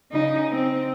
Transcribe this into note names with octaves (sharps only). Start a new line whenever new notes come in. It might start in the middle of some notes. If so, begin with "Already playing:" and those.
C#3 D#4
C4